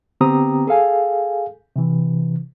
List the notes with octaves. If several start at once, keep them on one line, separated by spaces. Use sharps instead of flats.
D3 B3 C4 G4 A#5 D#6
G#4 A4 F5 G#5
C3 E3